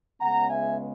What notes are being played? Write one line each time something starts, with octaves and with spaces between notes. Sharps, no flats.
C#2 C#3 G#3 B3 F#5 A#5
E5 G#5